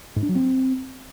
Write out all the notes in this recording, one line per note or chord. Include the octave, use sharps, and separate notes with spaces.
G#2
D4
F#3
C4